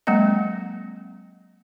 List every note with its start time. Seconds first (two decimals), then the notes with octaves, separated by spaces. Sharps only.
0.07 F#3 G#3 A#3 C4 D#5